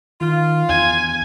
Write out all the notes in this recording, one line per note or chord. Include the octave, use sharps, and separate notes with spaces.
D#3 F4
E2 G#5